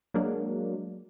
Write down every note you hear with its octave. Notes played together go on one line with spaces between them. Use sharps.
F#3 G#3 A#3 D4